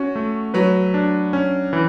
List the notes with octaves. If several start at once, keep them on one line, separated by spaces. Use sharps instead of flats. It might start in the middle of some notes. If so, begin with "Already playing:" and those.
Already playing: C#4 F#4
A3
F#3 B4
D4
C#4
E3